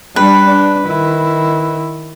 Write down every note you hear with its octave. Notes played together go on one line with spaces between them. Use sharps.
G3 D4 B4
D4
D#3 E4